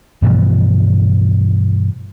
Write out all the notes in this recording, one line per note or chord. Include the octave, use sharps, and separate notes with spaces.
G2 B2 E3 F3